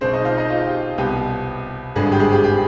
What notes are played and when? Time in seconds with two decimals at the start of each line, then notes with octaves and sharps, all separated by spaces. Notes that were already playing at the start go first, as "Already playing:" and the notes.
0.01 B1 B2 G#3 C4 C5
0.13 D#4 D#5
0.25 F4 F5
0.37 D#4 D#5
0.50 F4
0.66 G4
0.98 C2 B2 B3 G4
1.96 G#1 G2 D3 G#3 G#4
2.12 G4
2.19 G#3 G#4
2.32 G4
2.44 G4